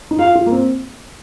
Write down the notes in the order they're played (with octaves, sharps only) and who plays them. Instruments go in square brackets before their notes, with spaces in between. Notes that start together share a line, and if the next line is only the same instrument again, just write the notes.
[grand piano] D#4
[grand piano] F4 [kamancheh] F5
[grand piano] F4
A#3
C4